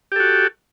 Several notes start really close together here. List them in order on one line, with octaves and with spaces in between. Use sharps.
G4 A4 F#4